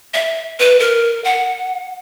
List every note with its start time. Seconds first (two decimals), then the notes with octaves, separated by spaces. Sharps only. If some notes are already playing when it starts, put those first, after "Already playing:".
0.14 E5
0.60 B4
0.80 A#4
1.24 F#5